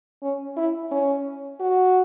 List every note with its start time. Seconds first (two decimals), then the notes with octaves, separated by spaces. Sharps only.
0.22 C#4
0.57 E4
0.92 C#4
1.60 F#4